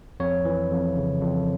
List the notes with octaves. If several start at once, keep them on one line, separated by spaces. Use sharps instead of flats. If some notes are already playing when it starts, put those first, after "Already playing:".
F2 C#5
E3
F2
C#3
F2